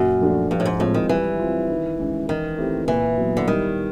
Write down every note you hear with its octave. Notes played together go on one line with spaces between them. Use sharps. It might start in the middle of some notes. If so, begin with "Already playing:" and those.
Already playing: F#2 A#2
F3 A3 D4 F#4
G2 F3
A2
G#2
A2 G#3 C4 F4
D#3
E3 G3
C4 F4
D#3
G#3 C#4 E4
D#3 E3
A3 C4 E4 G4
A#2 E3
F#3 B3
D3
D#3 G3